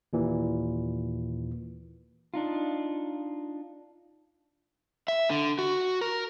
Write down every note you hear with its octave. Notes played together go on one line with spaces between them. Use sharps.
D#2 A#2 E3
D4 D#4 F4
E5
D3
F#4
A#4